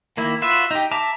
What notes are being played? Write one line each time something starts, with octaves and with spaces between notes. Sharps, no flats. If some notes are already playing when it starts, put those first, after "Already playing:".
D#3 A#3 E4
F4 F#4 B4 E5
D#4 G4
E5 A5 A#5 D6